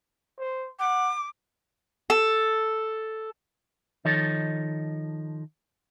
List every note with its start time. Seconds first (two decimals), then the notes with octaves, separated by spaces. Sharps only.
0.39 C5
0.79 F#5 D6
2.10 A4
4.05 D#3 F3 D#4 A4 C#5